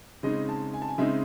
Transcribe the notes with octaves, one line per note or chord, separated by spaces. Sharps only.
C#3 G#3 C4 D#4 D#5
A5
G#5
A5
G#5
C#3 G#3 C4 D#4 E5